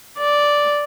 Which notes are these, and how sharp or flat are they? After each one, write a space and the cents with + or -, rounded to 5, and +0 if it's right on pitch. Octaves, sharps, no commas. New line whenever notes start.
D5 -5